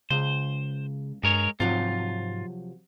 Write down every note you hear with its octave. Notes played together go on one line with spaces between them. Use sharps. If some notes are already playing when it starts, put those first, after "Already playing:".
C#2 C#3 C5
G2 G#3 A#4 C#5
G#2 C3 F3 F#3 F4